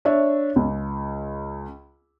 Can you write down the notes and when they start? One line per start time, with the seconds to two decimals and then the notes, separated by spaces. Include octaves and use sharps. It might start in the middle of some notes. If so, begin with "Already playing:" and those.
0.05 D4 C#5 E5
0.56 C#2